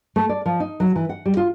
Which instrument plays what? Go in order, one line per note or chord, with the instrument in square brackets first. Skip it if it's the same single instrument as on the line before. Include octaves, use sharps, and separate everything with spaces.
[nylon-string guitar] A3
D5
F3
D#4
F#3
E3
F#5
G3
F4